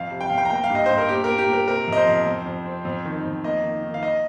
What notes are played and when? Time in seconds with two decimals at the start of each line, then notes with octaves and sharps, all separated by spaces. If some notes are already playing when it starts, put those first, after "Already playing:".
Already playing: F2 F5
0.11 C3
0.21 G5
0.30 F2 F5
0.38 G5
0.45 A#5
0.50 A#3 G5
0.64 F5
0.70 G2
0.75 D#5
0.86 G2 C5
0.98 A#4
1.09 A#2 G4
1.24 A#3 A#4
1.38 G4
1.48 A#2
1.53 A#4
1.68 C3 A#4
1.88 F2 D#5
1.97 C5
2.07 F2
2.27 F2
2.46 F2
2.66 C4
2.85 F2
3.05 D#3
3.24 F2
3.44 A#3 D#5
3.64 D#3
3.83 D#3
3.94 F5
4.03 D#5